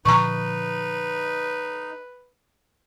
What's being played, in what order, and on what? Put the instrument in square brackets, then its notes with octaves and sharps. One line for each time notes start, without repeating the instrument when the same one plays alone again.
[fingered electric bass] A#2 D3 F3 [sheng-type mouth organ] D#4 [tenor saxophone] B4 [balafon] A#5 C#6